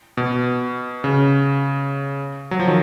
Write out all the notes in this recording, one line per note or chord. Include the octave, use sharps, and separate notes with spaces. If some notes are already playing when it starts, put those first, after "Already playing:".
B2
C#3
F#3
F3
D#3